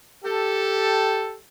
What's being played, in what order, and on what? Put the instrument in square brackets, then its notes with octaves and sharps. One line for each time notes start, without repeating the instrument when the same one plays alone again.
[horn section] G4 A4